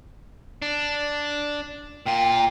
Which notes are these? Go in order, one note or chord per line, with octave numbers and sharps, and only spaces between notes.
D4
A#2 F4 G5